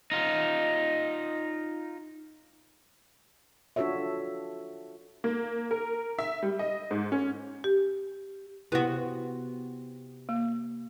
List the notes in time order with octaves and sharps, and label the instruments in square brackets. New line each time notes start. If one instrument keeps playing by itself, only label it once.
[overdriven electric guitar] D#4 F4
[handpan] D4 F4 F#4 A4 C#5 E5
[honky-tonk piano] A#3
A#4
E5
G3
D#5
G#2
C#4
[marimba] G4
[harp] C3 C6 [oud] B3 F#4 [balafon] E4
[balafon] A#3